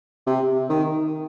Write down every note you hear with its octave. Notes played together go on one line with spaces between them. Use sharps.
C3
D#3